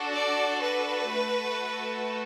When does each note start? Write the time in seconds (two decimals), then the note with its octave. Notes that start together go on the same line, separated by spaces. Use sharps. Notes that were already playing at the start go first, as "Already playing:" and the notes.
Already playing: D4 F#4 A4
0.15 D5
0.64 B4
1.12 A3 F#4 A4